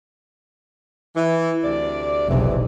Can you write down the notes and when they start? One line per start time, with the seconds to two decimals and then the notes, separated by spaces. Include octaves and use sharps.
1.15 E3
1.64 D2 C3 D5
2.29 F1 B1 E2 E3